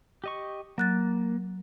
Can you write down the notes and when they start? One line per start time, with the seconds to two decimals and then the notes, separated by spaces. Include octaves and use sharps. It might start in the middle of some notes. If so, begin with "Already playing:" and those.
0.24 G4 D#5 C#6
0.78 F#3 A#3 F#6 A6